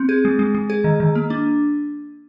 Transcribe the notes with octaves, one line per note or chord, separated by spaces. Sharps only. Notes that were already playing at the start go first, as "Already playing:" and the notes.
Already playing: C4
G#4
G#3
G#3
G#3
G#4
D#3
D#3
A#3
D4